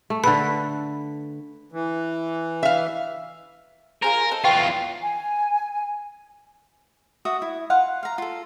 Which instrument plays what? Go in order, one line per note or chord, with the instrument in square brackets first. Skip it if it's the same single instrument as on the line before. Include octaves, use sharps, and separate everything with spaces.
[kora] A3
[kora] D3 A4 B4 [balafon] B5
[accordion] E3
[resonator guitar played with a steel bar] E5 F5
[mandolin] F4 G#4 C5 [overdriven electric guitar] A#4
[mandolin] A4 C5 D#5
[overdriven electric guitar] E2 F4 [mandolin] B4 G5 C#6
[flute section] G#5
[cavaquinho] F#4 E5 D#6
E4
F4 F5 F#5
F5 A#5
F4 A4